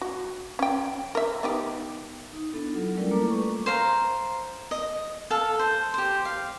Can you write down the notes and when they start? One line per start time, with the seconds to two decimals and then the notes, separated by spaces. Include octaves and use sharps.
0.01 F#4
0.59 C#4 G5
1.15 A#4 E5
1.43 B3 D#4 G4
2.33 D#4
2.54 B3 D4 E4 A4
2.73 F#3 F4
2.97 G3 A3 C#4 E4 A#4 D5
3.11 A3 A#3 F4 A4 A#5 D6
3.30 G3 B4 C#6
3.66 C5 F5 A#5
4.71 D#5
5.31 A4 F5 A5
5.59 C5
5.94 G4 C5
6.25 F5